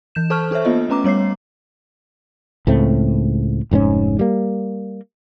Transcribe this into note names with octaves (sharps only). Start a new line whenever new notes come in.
E3 G6 E7
A4 C5 A5 C#6 F6
D4 A4 C5 C#5 E5
A#3 B3 F4 D#5
A3 C#4 B4 A#5 D6
G3 B3 C#5 D6 C7
C#2 A2 A3 C4
F1 G#2 C4 C#4
G3 A#3